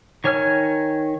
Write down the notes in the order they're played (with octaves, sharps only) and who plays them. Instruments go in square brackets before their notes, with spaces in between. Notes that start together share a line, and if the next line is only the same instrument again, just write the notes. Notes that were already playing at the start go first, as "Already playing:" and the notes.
[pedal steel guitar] D#3 C#5 G#5 F6